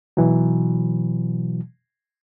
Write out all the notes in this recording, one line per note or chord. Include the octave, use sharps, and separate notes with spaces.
B2 E3 F#3